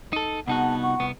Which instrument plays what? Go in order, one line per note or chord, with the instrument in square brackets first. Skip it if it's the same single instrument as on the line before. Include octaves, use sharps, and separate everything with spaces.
[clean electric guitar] D#4 A4
[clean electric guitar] C2 D#4 F#4 [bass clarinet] B3 [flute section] G#4 F#5 A5
[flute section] F4 F#5 C#6
[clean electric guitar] C2 B3